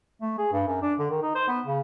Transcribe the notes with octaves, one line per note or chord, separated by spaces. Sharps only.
A3
G#4
G2
F#2
D4
D3
D#3
D#4
C5
B3
C#3